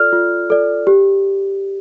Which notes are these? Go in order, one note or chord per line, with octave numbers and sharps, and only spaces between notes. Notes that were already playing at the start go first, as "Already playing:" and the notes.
Already playing: F4 A4 D5 F6
F4
A4 D5
G4